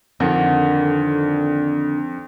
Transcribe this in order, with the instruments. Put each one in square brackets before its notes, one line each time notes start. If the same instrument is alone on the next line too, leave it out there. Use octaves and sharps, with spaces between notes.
[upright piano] F2 [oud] D3 D#3